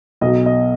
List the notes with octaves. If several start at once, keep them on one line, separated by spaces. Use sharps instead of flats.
B1 B2 F#3 D#5
D#5